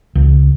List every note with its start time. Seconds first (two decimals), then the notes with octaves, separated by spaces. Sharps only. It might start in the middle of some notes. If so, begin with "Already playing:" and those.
0.15 C#2